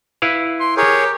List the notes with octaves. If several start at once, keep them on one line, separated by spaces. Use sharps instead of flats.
E4 B4 F5
C6
G4 G#4 A#4 C#5